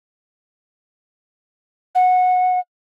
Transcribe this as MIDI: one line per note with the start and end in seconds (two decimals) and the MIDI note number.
1.95 2.59 78